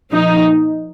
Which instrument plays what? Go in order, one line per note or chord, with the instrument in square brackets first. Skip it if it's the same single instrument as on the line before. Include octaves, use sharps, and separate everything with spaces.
[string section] A#2 F3 D#4